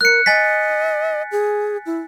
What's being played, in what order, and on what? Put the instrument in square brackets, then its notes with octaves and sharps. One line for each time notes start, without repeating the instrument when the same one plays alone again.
[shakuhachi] A#4 [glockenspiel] F#6 C#7
[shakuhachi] D#5 [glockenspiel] G#5 A6 B6
[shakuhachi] G#4
E4